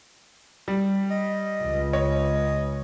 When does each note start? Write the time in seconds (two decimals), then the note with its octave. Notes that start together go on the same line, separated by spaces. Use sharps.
0.68 G3
1.11 D#5
1.63 C#2
1.93 C#5 D#5